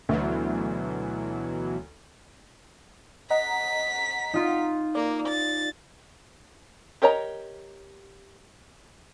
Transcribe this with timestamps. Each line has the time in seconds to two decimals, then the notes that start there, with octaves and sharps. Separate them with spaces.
0.09 D2 B2 E3 F#3
3.31 D#5 F#5 A#5 B6
4.34 D#4 F4
4.95 A#3 D5
5.28 A6
7.02 G4 A#4 C#5 D#5 A#5